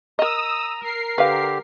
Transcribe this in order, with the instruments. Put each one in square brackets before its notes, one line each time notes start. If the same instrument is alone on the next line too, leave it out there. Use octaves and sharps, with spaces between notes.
[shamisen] A#4 D#5 [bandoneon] A#5 [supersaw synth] D#6 E6
[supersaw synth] A#4 C7
[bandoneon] D3 G4 [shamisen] B4 F5